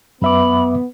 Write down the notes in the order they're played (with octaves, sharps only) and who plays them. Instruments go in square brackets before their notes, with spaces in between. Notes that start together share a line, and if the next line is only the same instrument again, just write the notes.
[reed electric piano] F#2 E5 D6 [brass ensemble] B3 [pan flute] B5